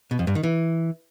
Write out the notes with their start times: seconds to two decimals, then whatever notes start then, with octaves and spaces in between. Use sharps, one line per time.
0.11 B2
0.19 F2
0.27 G2
0.35 D#3
0.43 E3